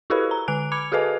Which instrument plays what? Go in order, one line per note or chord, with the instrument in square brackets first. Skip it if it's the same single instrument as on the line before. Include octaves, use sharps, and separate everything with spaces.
[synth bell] E4 F#4 G4 A4 B4 B5
A#5
D3 G#5 F#6 D7
B5 D6 G#6 C#7 F7
F#4 G#4 A4 B4 D#5 G#5